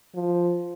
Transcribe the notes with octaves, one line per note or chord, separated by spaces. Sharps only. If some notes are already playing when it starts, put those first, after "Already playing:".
F3